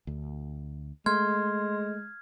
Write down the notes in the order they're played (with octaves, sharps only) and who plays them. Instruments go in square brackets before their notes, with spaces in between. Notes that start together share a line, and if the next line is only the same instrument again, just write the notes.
[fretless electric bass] D2
[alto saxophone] G#3 [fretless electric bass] A3 [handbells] C6 [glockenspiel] F6 G#6